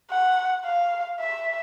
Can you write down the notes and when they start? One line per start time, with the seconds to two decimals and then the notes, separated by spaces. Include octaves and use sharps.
0.10 F#5
0.65 F5
1.19 E5